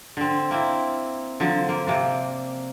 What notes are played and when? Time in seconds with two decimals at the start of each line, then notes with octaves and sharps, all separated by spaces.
0.17 D3 C4
0.51 A#3 C4 E4
1.40 D3 F3 F#3
1.69 A#3
1.87 C3 A#3 D4